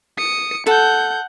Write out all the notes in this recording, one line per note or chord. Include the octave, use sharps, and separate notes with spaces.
D#6 C#7
A4 F#5 G6